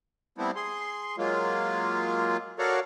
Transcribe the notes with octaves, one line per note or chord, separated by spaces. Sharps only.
G3 A3 B3 C4 E4
G#4 C6
F#3 G#3 A#3 F4
F#4 A4 A#4 C#5 D5 F5